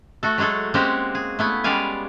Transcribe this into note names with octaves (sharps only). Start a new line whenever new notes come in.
A3 F#4 A4
F#3 G#3 A3 G#4 A4
G#3 A#3 C4 C#4 F#4 G4
G#4
A3 B3 E4
G3 G#3 C#4 D5 F5 G#5